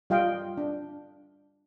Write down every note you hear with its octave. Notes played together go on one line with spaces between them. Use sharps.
G3 F4 D#5 F5 G5
D4